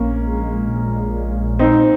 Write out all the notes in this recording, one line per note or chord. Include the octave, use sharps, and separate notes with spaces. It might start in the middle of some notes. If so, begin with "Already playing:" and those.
Already playing: A#1 A#3 C#4
G#3
A#2
A#2
A#2 C4 D#4